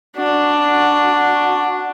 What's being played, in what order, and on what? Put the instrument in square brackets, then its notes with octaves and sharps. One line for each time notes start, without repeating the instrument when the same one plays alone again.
[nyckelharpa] D4 [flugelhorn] F#4